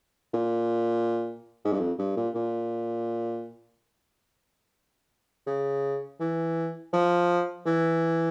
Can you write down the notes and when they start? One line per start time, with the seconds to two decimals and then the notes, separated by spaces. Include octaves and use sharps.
0.34 A#2
1.65 G#2
1.72 G2
1.80 F2
1.99 G2
2.17 A#2
2.35 A#2
5.47 C#3
6.20 E3
6.93 F3
7.66 E3